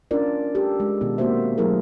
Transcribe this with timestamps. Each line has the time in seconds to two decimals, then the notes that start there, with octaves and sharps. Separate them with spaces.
0.11 C#4 D4 F4 A#4 D5
0.55 G4 A4
0.80 G#3
1.01 B2 D#3 B3 F4
1.18 A#3 C4 F#4 C5 E5
1.58 F#3 A3 E4 G#4 A#4